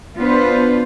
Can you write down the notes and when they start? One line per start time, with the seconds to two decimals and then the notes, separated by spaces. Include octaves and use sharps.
0.16 B3 D4 F4 B4 C5